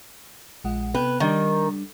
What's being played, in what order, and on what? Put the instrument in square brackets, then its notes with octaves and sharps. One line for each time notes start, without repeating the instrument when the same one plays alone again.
[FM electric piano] A#1 G#3 F#5
[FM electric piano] C3 B3 G5 [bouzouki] B4
[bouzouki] D#3 [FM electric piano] G3 D4